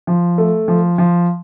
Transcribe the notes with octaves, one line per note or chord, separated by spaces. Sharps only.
F3
A3
F3
F3